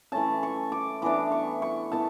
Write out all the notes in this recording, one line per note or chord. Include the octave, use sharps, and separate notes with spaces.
E3 A3 C#4 A5
C#6
D6
E3 B3 D4 D6
C#6
C#6
B3 E4 A5